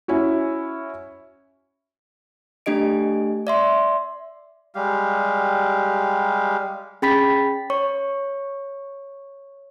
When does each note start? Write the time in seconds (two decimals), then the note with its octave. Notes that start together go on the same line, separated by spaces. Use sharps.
0.08 C#4 E4 F#4
2.66 A3 D4 G4 D#5 D7
3.47 D5 E5 C6
4.74 G3 G#3 G4 F5
7.02 C#4 G#4 G5 B5 A6 B6
7.70 C#5 C#6